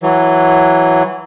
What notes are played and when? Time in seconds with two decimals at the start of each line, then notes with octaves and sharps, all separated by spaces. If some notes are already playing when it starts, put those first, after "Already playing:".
0.03 E3 F#3